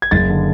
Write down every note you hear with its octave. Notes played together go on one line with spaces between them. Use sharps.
G#6
F#1 A6
D3